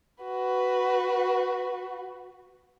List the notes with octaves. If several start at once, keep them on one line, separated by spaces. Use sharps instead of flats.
F#4 B4